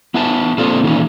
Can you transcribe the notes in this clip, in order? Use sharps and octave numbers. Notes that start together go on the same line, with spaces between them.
B3 E4 E5 G#5 A5
A#3 C4 D4 F4 G#4 A4
D#3 E3 A#3 C#4 D#4